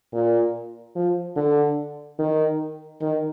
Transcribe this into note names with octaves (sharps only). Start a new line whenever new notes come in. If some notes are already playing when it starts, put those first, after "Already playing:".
A#2
F3
D3
D#3
D#3